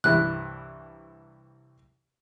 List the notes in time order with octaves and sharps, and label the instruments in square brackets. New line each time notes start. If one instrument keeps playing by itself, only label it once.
[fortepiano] C2 G2 E3 [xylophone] F#6